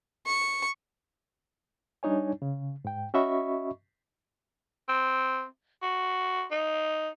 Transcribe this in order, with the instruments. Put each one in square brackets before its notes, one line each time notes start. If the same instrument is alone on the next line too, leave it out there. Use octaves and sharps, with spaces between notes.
[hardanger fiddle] C#6
[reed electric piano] G3 D4 D#4 C#5 G#5
C#3
G#2 G5
C#4 F#4 D#5 E5 B5 C#6
[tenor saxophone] C4
F#4
D#4